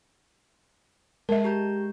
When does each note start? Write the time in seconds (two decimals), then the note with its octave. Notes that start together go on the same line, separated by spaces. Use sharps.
1.29 G#3 A#4 E5 A5
1.44 G4 A#5 G6